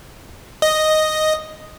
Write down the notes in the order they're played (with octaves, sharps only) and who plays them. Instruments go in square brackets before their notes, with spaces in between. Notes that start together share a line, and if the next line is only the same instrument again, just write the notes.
[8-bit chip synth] D#5